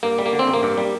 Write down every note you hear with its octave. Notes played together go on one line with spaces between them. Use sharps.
G2 A#3
G3
A#3
D3
C4
A1
A#3
G2
G3